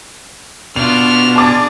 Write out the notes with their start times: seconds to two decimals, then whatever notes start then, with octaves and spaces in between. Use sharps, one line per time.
0.76 B2 D4 F4 F6 F7
1.36 D4 G#4 A5 D6 A6